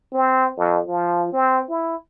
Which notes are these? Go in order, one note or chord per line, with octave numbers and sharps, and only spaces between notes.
C4
F2
F3
C4
E4